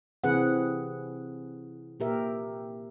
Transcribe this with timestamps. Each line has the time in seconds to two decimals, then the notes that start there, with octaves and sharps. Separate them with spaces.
0.24 C3 E3 C4 G#4 B4 F#5
2.00 A#2 G4 A#4 E5